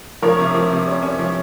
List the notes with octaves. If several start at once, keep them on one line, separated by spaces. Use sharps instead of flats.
F3 A#4 C#5
C3
F3
C3
C#4
C#4
F3